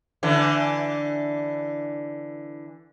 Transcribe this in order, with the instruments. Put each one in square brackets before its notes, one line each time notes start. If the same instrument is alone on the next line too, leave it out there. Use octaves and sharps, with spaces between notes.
[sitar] D3 E3